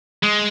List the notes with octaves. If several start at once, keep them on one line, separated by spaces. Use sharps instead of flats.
G#3